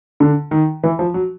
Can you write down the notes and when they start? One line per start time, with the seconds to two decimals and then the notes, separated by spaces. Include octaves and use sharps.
0.20 D3
0.51 D#3
0.83 E3
0.99 F3
1.14 F#3